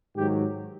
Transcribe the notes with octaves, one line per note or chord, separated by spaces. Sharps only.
G#2 D#3 F#3 G4